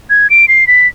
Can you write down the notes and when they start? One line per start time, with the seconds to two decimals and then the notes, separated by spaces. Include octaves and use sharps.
0.10 G#6
0.30 D7
0.48 C7
0.67 B6